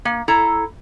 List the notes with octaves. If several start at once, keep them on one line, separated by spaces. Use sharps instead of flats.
A#3
E4 A4 A#5